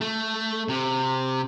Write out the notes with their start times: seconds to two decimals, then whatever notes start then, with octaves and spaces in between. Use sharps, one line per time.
0.01 A3
0.69 C3